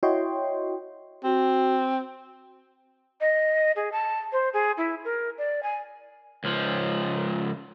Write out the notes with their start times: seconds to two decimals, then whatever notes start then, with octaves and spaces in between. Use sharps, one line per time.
0.03 E4 F#4 C#5 D#5 G5 C6
1.24 C4 F#4
3.21 D#5
3.76 G#4
3.92 A5
4.33 C5
4.53 G#4
4.78 E4
5.05 A#4
5.38 D5
5.63 G#5
6.44 C#2 F3